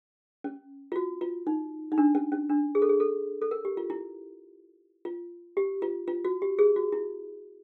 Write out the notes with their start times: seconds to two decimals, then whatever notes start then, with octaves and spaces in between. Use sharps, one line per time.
0.44 C#4
0.92 F4
0.96 F#4
1.21 F4
1.47 D#4
1.92 D#4
1.98 D4
2.15 C#4
2.32 C#4
2.50 D4
2.75 G#4
2.82 A4
2.89 G#4
3.00 A4
3.42 A4
3.51 A#4
3.65 G4
3.77 F4
3.90 E4
5.05 F4
5.57 G4
5.82 F4
6.08 F4
6.25 F#4
6.42 G4
6.59 G#4
6.76 F#4
6.92 E4